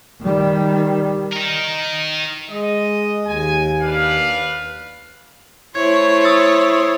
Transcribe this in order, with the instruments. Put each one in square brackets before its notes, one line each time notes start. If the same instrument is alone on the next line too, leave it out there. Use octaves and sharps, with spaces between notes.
[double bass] D#3 G3
[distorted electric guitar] D#4 A#4
[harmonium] G#3 [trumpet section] D#5
[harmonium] D#2 [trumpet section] G#5
[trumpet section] D4 B4 F5
[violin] A3 C#5 [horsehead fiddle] E4 C5 [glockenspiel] G#6
[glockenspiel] D#6 E6 A6